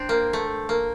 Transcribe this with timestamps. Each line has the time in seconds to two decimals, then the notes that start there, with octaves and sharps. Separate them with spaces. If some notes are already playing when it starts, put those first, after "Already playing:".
Already playing: C4 D4
0.09 A#3
0.33 A3
0.69 A#3